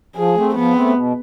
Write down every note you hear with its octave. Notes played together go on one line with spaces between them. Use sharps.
F3 G#4
A3 C4
F3 B3
A3 C4
B2